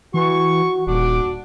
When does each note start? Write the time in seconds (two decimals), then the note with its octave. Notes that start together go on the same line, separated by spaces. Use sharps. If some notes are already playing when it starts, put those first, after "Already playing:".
0.14 E3 F#4 C#6
0.87 D#1 D4 F#4 D6